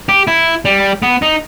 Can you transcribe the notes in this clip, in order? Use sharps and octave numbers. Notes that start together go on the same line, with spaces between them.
G4
E4
G3
B3
D#4